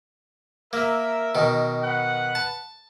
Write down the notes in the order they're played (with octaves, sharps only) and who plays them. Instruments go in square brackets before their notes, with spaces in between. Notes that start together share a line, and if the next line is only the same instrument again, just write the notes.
[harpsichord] A#3 [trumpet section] A#4 E5
[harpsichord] B2 D#3
[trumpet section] B4 F#5
[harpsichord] A5